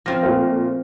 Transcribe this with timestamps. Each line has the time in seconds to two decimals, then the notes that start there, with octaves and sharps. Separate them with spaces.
0.06 F3 C4 F6 A#6
0.23 A#2 A3 C5